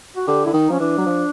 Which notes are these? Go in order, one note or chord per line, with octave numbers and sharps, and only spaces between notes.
F#4
D3 G4
D3 E4
D#3 D#4
F3 C#4
E3 D4
F#3
F3